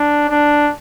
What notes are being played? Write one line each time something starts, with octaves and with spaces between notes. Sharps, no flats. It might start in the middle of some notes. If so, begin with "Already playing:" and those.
Already playing: D4
D4